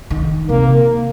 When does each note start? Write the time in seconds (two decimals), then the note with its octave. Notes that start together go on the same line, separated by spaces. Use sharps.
0.10 D#3
0.49 C3 A#3